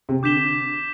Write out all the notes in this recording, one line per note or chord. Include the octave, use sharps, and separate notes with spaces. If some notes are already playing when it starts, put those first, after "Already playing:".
C3
D3 D6 G6 B6 E7 G7